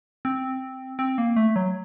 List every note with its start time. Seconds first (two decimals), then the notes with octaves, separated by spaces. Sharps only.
0.25 C4
0.99 C4
1.18 A#3
1.36 A3
1.56 F#3